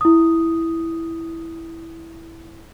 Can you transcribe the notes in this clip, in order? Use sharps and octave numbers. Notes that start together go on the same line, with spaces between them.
E4 D#6